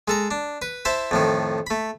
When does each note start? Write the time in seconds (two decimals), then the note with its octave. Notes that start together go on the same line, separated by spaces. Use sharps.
0.08 G#3 A4 A#5
0.31 D4
0.62 B4
0.85 E4 C5 A5 B5
1.11 F2 A2 D#3
1.67 A3 B5